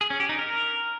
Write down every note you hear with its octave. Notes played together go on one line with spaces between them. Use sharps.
G#4
C#4
G4
D#4
A#4